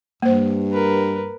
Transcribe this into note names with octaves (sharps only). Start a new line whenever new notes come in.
G2 A#3 C5
A#4 B4